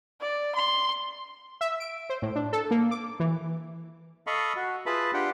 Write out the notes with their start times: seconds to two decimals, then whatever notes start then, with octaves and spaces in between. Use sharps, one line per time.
0.21 D5
0.56 C6
1.61 E5
1.80 D7
2.10 C5
2.22 A2
2.36 D4
2.53 A4
2.71 A#3
2.91 D6
3.20 E3
4.27 A4 D#5 F5 B5 C#6
4.56 F#4
4.86 F4 G#4 B4 E5 A5 B5
5.14 D4 F4 G4 F#5 G5